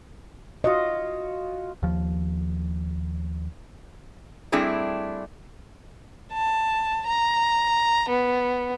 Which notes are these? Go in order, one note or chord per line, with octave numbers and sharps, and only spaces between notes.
F4 F#4 C#5 D#5
D#2 F3
G3 A3 C4 D4 E4 G#4
A5
A#5
B3